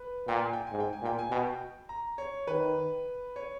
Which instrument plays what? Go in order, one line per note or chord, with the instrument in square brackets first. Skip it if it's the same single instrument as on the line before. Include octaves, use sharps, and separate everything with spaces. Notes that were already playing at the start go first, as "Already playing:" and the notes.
Already playing: [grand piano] B4
[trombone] A#2 [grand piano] G5
[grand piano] G#5
G5
[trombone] G#2 [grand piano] G#5
[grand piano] G5
G#5
[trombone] A#2
[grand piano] G5
G#5
[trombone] B2 [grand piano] G5
[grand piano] A#5
C#5
[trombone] D#3 [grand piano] B4
[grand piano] C#5